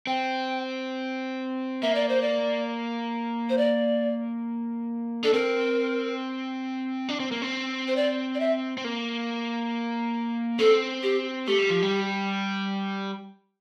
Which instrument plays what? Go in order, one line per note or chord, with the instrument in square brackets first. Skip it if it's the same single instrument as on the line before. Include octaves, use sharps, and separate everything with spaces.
[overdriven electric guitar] C4 [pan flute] G5
[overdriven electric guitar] A#3 [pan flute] E5
[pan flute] D5
C5
D5
C5
D5
[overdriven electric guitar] D4 [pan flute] A4
[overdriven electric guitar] C4 [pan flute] A#4
[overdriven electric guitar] D4
C4
A#3
C4
[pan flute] C5
D5
D5
E5
[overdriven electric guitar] C4
A#3
[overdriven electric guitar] C4 [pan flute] A4
[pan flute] G4
[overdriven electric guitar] A3 [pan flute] G4
[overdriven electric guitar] G3
F3
G3